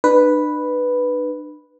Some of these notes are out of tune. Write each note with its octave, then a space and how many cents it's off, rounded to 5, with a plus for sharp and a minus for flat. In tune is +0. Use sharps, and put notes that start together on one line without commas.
D4 +40 B4 +0